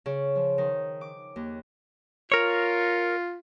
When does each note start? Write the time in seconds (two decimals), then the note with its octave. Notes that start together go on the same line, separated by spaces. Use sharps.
0.06 C#3
0.36 F3
0.58 D#3
1.01 D6
1.36 D#2
2.32 F4 A#4 C#5